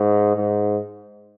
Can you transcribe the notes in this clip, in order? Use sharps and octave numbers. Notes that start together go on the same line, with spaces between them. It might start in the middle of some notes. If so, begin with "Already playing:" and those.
Already playing: G#2
G#2